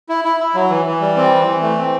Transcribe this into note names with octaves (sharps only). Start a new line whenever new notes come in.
E4
E4
E4
F#3
E3
E3
G3
C4
E3
E3
A3
C4